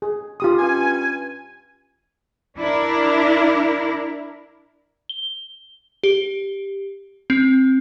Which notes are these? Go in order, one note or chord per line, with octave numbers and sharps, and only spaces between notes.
G#4
F4 G4 D#6
G2 C#4 G#5
D4 E4 A#4
G7
G4
C4